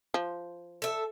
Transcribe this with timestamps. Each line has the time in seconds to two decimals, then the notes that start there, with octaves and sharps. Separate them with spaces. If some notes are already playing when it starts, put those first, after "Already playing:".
0.14 F3
0.82 A4 E5